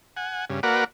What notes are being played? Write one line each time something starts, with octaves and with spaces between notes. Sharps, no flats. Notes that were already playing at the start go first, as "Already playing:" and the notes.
F#5 G#5
G2 C#3
A#3 F#4 A#4 B4 D5 F#5